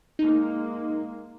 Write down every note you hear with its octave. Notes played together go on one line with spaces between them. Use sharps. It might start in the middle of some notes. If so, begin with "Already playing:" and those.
G#3 A#3 D#4